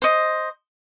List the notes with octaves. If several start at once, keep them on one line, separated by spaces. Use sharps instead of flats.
C5 D#5